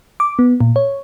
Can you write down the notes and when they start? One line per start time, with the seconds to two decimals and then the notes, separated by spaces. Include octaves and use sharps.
0.20 D6
0.39 B3
0.61 A#2
0.76 C#5